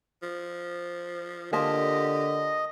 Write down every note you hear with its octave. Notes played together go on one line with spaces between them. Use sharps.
F3
D3 A#3 F4 G4 D#5 A5